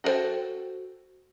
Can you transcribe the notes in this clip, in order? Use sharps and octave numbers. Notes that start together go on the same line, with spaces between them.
F#4 G#4 A4 C5 G5